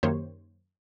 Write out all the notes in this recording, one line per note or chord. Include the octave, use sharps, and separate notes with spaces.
F#2 D#3 A#3 G4 C5 C#5